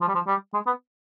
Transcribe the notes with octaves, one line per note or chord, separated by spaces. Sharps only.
F3
G3
F3
G3
G#3
B3